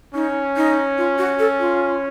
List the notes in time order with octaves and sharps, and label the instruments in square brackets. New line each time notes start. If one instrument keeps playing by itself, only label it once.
[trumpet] C#4 [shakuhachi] D#4
[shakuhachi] D#4
F4
F#4
A4
F4